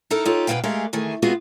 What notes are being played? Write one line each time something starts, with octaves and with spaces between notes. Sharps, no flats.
D#4 E4 A4 A#4
D#4 F4 G4 A4 C#5
G#2 B2 F3 B4 F5 G5
G#3 A3 G4 G#4 A#4 F5
D#3 E3 A3 G#4
G#3 B3 C4 F4 F#4 G#4